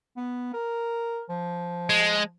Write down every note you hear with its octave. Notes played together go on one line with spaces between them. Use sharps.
B3
A#4
F3
G#3